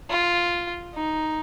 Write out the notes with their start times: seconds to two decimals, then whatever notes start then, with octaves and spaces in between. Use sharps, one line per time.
0.10 F4
0.95 D#4